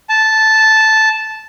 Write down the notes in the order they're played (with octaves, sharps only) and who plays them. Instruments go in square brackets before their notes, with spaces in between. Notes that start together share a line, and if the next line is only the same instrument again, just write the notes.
[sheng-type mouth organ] A5